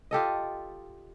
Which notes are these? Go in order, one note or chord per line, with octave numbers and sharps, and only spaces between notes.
F4 G4 A4 D#5